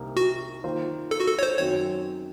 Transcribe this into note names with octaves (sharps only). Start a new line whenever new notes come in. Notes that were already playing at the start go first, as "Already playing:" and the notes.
Already playing: C2 C3 D#3 A#3 D#4
F#4
D#3 A#3 F4 C5
A4
F#4
A4
C#5
C5
F#2 D#3 F#3 C4 F#4 C#5